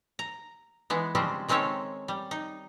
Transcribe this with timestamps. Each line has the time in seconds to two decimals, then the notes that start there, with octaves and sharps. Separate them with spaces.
0.19 A#5
0.90 E3 G#3 B3
1.15 C#3 F3 G3 G#3 C4 C#4
1.48 D#3 G#3 C4 C#4 A4 C#5
2.08 G3
2.31 D#4